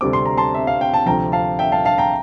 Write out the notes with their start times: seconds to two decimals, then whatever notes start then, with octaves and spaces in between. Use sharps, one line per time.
0.01 D2 C3 G3 C4 D6
0.13 C6
0.26 A#5
0.37 A5 C6
0.54 E5
0.67 F5
0.81 G5
0.94 A5
1.06 D2 C3 F3 G5 A#5
1.32 F5 A5
1.59 E5 G5
1.72 F5 A5
1.85 F5 A5
1.98 G5 A#5